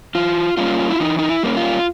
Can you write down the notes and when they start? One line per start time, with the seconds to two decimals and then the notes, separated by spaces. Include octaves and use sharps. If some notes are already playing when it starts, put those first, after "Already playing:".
0.15 E3 F4
0.57 G3 A#3 C#4 F4
0.90 E4
1.00 E3 D#4
1.19 D#4
1.29 E4
1.43 G3 A#3 C#4
1.57 F4